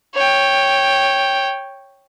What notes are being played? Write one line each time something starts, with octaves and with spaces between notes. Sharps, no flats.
C#5 G5